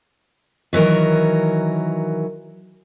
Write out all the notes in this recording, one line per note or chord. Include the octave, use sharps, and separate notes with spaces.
D#3 E3 F#3 A#4